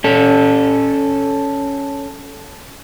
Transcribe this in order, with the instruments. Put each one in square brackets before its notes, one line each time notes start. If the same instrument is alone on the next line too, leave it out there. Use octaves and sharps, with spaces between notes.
[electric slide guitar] C#4 A4